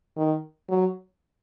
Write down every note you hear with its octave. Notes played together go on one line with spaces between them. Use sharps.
D#3
F#3